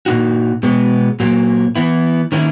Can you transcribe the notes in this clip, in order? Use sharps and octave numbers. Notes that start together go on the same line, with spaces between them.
A#2 A#3 D#4 F#4
B2 G#3 B3
A#2 F#3 A#3
E3 B3 E4
D#3 A#3 C#4 E4